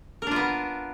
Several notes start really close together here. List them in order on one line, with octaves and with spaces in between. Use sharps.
A#4 D4 F4 B3